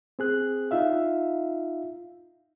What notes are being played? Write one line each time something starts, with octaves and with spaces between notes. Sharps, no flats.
C4 G#4 F#6
D#4 F4 E5 F5